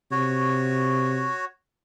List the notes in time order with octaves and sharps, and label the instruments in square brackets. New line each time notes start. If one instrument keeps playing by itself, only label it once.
[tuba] C3 [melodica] F#4 C#5